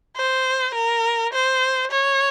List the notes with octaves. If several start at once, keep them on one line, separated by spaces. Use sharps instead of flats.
C5
A#4
C5
C#5